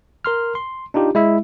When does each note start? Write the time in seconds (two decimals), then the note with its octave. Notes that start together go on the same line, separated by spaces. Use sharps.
0.25 A#4 C6 F6
0.55 C6
0.94 D4 D#4 F4 G4
1.15 G#3 E4 E5